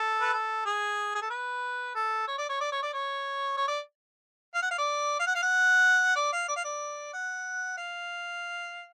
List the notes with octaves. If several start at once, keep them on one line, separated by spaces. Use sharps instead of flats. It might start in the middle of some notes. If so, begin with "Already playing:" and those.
Already playing: A4
B4
A4
G#4
G#4
A4
B4
A4
C#5
D5
C#5
D5
C#5
D5
C#5
C#5
D5
F5
F#5
F5
D5
F5
F#5
F5
F#5
D5
F5
D5
F5
D5
F#5
F5